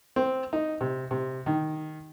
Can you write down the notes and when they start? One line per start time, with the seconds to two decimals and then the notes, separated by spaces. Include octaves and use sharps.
0.16 C4
0.53 D#4
0.81 C3
1.11 C3
1.46 D#3